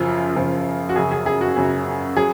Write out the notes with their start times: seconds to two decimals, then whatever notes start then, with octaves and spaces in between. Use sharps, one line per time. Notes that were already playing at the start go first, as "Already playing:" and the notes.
Already playing: F#2 C#3 F3 F4
0.36 F#2 C#3 F3
0.89 F#4
0.96 F#2 C#3 F#3 G#4
1.12 G#4
1.26 G#4
1.41 F#4
1.56 F#2 C#3 F#3
2.17 F#3 G#4